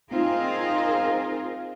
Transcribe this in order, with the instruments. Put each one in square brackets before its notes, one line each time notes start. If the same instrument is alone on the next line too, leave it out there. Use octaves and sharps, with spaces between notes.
[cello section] C4 D#4 F4 G#4 A#4